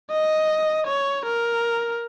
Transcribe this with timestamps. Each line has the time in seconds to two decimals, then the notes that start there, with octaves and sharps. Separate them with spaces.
0.12 D#5
0.87 C#5
1.26 A#4